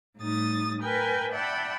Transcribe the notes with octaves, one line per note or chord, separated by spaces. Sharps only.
A2 G3 D#4 D#6 A6
A#4 B4 G5 G#5
D5 E5 F#5 G5 A5 B5